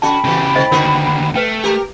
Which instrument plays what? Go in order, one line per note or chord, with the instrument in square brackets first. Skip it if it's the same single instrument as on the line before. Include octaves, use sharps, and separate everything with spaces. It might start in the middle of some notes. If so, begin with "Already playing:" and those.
[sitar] C#3 F#4 [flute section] G5 B5 [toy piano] A5
[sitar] A#2 E3 A3 [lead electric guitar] C#3 G4
[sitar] G#2 [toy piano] C5 D#5
[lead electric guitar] D#2 D3 [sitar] D#4 F#4 B4 [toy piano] A#4
[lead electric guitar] A3 [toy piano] B4 G5
[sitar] G4 A#4